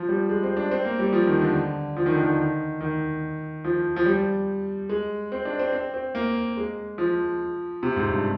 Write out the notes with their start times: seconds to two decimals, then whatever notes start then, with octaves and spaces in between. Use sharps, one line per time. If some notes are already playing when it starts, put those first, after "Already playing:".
Already playing: F3
0.09 G3
0.29 G#3
0.43 C4
0.57 D4
0.71 C4
0.85 A#3
0.99 G3
1.13 F3
1.27 D#3
1.41 D3
1.96 F3
2.06 D#3
2.14 D3
2.22 D#3
2.81 D#3
3.64 F3
3.96 F3
4.06 G3
4.89 G#3
5.32 C4
5.45 D4
5.59 C4
5.73 C4
5.94 C4
6.15 A#3
6.57 G#3
6.98 F3
7.83 C3
7.96 G#2
8.10 G2